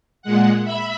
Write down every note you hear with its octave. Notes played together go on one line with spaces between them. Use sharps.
A#2 G#3 F#5
E5 B5